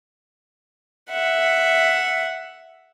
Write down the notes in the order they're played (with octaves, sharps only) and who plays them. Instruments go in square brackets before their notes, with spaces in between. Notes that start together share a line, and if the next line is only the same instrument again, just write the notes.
[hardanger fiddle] E5 F#5